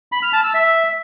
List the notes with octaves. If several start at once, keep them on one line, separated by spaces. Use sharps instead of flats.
B5
F6
A5
E6
E5